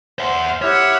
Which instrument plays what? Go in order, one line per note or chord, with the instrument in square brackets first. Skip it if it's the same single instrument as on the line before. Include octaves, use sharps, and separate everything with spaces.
[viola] C5 [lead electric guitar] E5 F#5
[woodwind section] E4 G4 F6 [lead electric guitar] C#5 [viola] E5 F#5